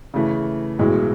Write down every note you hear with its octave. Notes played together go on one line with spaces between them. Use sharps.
C#3 E3 A3
B1 A2 E3 G#3